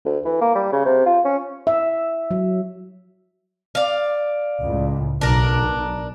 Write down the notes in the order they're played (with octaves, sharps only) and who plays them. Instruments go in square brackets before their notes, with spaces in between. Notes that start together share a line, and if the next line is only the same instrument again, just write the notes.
[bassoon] D2
E3
A#3
G3
C#3
C3
F4
C#4
[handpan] E5
F#3
[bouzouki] D5 F5
[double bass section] C#2 A2
[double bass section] B1 [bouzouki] D4 A#4